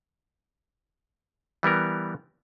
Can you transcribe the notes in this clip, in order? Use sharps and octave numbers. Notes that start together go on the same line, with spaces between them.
E3 G3 B3 A#4